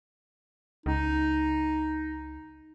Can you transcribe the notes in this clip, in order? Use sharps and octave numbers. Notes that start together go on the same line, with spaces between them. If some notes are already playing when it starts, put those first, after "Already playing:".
C#2 D#4